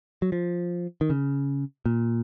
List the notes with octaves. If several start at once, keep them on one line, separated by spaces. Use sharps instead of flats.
F#3
F3
D#3
C#3
A#2